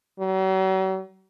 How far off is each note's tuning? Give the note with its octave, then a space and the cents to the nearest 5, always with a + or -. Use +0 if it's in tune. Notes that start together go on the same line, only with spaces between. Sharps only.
F#3 +45